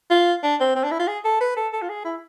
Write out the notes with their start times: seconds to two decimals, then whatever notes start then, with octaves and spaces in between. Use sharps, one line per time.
0.10 F4
0.43 D4
0.60 C4
0.75 C4
0.84 D4
0.91 E4
0.99 F4
1.08 G#4
1.25 A4
1.41 B4
1.56 A4
1.73 A4
1.82 F4
1.89 G#4
2.04 E4